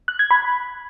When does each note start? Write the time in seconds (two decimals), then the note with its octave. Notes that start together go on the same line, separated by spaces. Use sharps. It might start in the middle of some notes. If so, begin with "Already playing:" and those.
0.08 F#6
0.19 G#6
0.31 B5